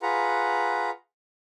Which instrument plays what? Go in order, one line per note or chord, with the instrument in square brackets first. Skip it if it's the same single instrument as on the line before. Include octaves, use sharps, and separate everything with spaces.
[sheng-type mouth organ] F4 G#4 B4 F#5 A#5